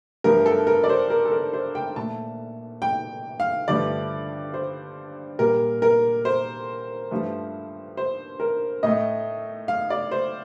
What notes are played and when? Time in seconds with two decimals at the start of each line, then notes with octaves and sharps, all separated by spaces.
0.24 G2 F3 A3 A#4
0.46 A4
0.67 A#4
0.84 D5
0.89 C5
1.10 A#4
1.25 A4
1.32 A#4
1.53 C5
1.75 G5
1.96 A#2 A3 A5
2.82 G5
3.40 F5
3.68 G2 D3 F3 A3 D5
4.54 C5
5.39 A#2 G3 A#4
5.82 A#4
6.25 C5
7.11 G2 F3 A3
7.97 C5
8.40 A#4
8.83 A2 A3 D#5
9.68 F5
9.90 D5
10.11 C5